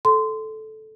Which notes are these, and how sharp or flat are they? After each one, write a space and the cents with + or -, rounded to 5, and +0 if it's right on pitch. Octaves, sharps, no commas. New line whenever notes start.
A4 -10 C6 -20